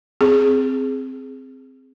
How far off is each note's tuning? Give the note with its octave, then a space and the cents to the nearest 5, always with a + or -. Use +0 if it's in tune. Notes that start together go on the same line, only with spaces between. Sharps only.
C4 +0 G#4 +0